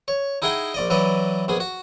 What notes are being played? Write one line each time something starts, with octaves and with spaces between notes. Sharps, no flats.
C#5
D#4 E4 G#4 F#5 G5 A#5
A#1 D5 D#5
E3 F#3 B4 D5 D#5
A#1 B3 G#4
F#4